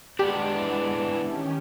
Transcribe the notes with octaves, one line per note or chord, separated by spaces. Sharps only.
G#3 B3 D4 G4
E3
D#3 C#4 G4